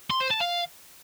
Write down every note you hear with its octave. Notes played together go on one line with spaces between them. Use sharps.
C6
C5
A5
F5